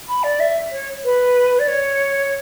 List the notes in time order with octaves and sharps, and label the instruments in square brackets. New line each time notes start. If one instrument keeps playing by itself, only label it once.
[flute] B5
D5
E5
C#5
B4
D5
C#5